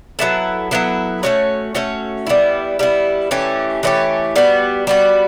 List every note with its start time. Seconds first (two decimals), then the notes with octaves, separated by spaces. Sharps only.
0.19 F#3 B3 E4 A4
0.71 F#3 B3 E4 A4
1.23 A3 C#4 F#4 C#5
1.75 A3 C#4 F#4 C#5
2.27 G3 B3 E4
2.79 G3 B3 E4
3.31 E3 A3 C#4 G4
3.83 E3 A3 C#4 G4
4.36 G3 B3 F#4
4.87 G3 B3 F#4